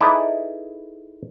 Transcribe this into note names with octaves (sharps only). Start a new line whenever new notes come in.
D#4 E4 G#4 A4 B4 D5